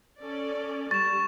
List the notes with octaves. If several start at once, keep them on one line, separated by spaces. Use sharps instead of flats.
C#4 A4 D5
G3 C#6 A6 E7